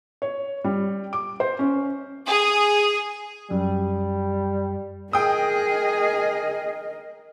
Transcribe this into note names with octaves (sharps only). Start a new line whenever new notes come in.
C#5
G3
D6
C5
C#4
G#4
F#2 G3
G#4 A#4 D#5 G5 D#6